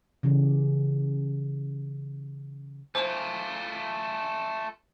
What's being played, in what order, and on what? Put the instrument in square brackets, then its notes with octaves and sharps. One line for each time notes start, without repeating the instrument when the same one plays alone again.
[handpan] C#3 E3 G4
[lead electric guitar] A3 F4 [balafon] C5